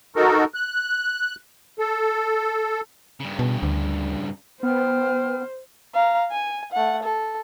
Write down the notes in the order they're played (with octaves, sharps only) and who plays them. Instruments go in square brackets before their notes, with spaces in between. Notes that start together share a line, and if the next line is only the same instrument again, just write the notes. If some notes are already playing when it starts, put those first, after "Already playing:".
[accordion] D#4 F#4 A4 A#4
F#6
A4
[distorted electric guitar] G2 C#3
[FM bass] B2
D2
[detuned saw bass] B3 [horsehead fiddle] C5 [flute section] G5 F6
[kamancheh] F5 A#5
G#5
A3 F#5
A4